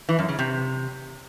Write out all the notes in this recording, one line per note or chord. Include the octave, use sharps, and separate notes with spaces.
E3
F#2
C#3
C3